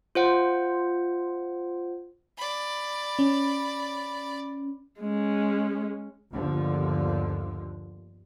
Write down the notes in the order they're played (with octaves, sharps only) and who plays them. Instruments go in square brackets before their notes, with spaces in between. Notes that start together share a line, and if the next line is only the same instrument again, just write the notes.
[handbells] F4 C5 F#5
[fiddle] D5 B5
[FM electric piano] C#4
[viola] G#3 C#4
[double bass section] G1 D#2 D3 F3